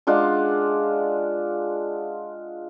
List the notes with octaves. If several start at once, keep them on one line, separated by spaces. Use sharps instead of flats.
G#3 D4 F4 F#5